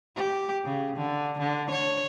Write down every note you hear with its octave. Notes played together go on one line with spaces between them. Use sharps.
G4
C#3
D3
D3
C#5